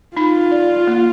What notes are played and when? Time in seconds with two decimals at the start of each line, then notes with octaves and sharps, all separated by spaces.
0.16 D#4 F4
0.52 D5
0.87 A#3